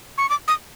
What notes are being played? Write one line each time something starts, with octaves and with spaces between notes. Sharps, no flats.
C#6
D6
D#6